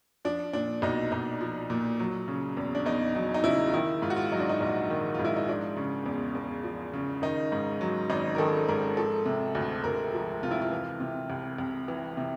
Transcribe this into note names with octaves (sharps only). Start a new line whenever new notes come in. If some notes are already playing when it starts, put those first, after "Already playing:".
F3 D4
A#2 D4
B1 D#4
B1 D#4
F3
A#2
F#3
C#3
E2
D4
E2 D#4
F#3 D#4
D#4
C#3 E4
F4
D#3 E4
G#2 F4
F#4
F4
F#3 D#4
D4
D#4
A#1
D#3
G#2 F4
E4
D#4
F3 D4
C#3
E2
E2
F3
C#3
D#3 D#4
G#2
F#3
G#1 D#4
A#4
D#3 A4
G#2 A#4
F3 A4
C3
D2
D2 A#4
F3
C3 F4
E4
F4
E3
C3
C2
C2
E3
C3